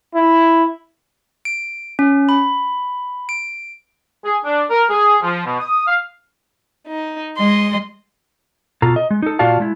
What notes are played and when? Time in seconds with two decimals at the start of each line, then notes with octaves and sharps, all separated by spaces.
0.15 E4
1.45 D7
1.99 C#4
2.29 B5
3.29 D7
4.25 G#4
4.45 D4
4.70 A#4
4.90 G#4
5.23 F3
5.46 B2
5.60 D#6
5.87 F5
6.87 D#4
7.36 G#3 D#5 C6
8.82 B2 F4 A4 A#5
8.96 D#5
9.11 G#3
9.22 D#4 A4
9.39 A#2 F4 F#4 D5 F5 A5
9.60 G#3 E4